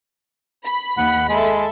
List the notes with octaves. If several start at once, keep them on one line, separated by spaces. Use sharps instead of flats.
B5
D#2 F#5
G#3 A4 E5